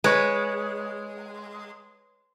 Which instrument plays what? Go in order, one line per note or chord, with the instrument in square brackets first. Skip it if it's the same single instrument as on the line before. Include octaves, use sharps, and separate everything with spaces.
[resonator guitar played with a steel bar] G#3 [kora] B4 C#5